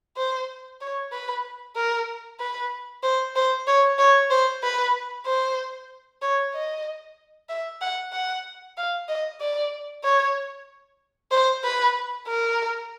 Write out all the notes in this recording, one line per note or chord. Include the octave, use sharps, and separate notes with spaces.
C5
C#5
B4
A#4
B4
C5
C5
C#5
C#5
C5
B4
C5
C#5
D#5
E5
F#5
F#5
F5
D#5
D5
C#5
C5
B4
A#4